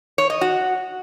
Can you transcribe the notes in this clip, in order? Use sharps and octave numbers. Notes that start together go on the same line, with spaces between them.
C#5
D#5
F#4